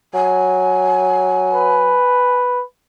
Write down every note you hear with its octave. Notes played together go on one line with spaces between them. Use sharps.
F#3 G#5
B4